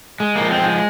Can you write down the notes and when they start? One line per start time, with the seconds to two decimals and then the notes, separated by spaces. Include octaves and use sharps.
0.20 G#3
0.36 A#3
0.41 F3
0.51 C4
0.62 G#3